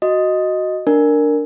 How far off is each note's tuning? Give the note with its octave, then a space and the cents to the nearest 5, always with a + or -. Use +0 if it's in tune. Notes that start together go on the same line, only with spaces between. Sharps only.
F#4 +0 D#5 +0
D4 +0 A#4 -10